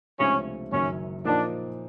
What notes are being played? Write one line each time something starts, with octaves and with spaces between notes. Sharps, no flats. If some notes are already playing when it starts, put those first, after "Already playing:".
C#2 C3 F3 A3 C#4 D4
F#1 F#2 D#3 C#4
A#2 F3 A#3 D4 D#4